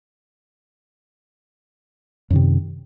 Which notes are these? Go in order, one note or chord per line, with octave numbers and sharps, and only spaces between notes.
F#2 C3 D#3